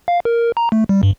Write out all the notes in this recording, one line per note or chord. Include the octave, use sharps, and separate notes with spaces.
F5
A#4
A#5
A3
G3
G2